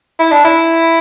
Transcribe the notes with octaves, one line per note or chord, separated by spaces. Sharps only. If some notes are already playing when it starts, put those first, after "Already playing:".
E4
D4
E4